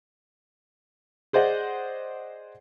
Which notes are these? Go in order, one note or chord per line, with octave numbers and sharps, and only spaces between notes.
G#4 C5 D5 D#5 F#5